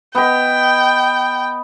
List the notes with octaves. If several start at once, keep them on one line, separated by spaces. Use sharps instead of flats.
B3 D#5 G5